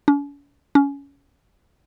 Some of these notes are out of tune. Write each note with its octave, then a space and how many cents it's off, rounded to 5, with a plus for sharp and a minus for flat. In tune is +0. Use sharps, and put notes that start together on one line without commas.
C#4 +45
C#4 +20